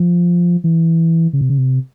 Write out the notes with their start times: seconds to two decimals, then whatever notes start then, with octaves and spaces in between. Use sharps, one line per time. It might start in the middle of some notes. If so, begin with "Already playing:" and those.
Already playing: F3
0.64 E3
1.33 C#3
1.41 C3
1.50 C#3
1.58 C3